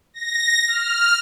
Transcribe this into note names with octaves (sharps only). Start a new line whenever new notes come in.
A#6
F6